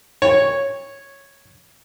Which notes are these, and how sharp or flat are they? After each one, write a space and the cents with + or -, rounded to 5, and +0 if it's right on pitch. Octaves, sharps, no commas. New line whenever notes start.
C#5 -5